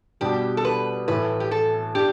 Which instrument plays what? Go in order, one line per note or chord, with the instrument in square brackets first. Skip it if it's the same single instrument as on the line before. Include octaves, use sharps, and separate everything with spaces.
[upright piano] B2 G3 D4 [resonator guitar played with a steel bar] G4
[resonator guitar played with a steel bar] A4
B4
[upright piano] A2 E3 A3 [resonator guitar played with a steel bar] B4
[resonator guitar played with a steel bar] G4
A4
[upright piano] D4 [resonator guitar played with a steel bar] G4